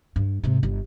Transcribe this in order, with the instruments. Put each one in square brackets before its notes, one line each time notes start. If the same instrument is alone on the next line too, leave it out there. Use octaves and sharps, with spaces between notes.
[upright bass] G2
G#2 C3
G1